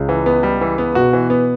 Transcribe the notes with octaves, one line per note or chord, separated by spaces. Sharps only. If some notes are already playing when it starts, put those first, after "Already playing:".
Already playing: C#2 C#3
E3
B3
G3
E3
B3
B2 F#4
E3
B3